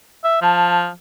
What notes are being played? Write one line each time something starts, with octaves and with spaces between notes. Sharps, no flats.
E5
F3 A5